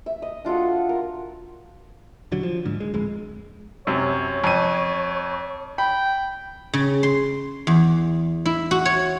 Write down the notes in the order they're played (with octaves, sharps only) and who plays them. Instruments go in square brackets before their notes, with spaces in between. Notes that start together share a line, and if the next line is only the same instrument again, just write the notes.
[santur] E5
D#5
D4 F4 F#4 A4
A#4
[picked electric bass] D#1 D3 F#3
F3
G#2 D3
G#3
D1 F2 G#3
[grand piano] F#2 C3 [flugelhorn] C#5
[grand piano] F2 D#7
[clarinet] G5 [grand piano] B5
[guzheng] C#3
C6
E2
E4
F#4
C#5